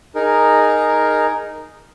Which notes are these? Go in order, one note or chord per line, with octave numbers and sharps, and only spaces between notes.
D#4 G#4 A#4